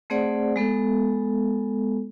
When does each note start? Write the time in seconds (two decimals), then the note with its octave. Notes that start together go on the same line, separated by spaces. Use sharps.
0.10 A3 C4 G#4 C5 D5 F#5
0.56 G#3 B3 A4